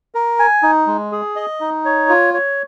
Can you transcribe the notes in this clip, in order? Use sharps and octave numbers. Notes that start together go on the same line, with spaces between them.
A#4
G#5
D#4
G#3
G#4
D#5
D#4
C#5
F4
C#5